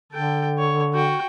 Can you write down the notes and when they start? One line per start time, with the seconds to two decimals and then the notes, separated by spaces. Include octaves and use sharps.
0.13 D3 A4 G5
0.58 C#5
0.94 F#4 G5